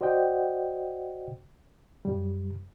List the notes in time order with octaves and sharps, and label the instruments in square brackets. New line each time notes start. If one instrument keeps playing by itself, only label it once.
[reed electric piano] F#4 C5 D5 D#5 F#5 G5
F#2 G3